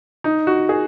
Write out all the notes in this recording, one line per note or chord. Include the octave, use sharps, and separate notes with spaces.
D#4
F#4
G#4